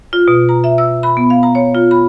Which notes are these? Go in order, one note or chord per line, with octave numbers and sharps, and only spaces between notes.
F4
B2
A#5
E5
E6
B5
B3
F5
A#5
C#5
F4
B5